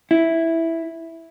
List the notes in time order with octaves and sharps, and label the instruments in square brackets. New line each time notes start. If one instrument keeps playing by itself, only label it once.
[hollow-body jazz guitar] E4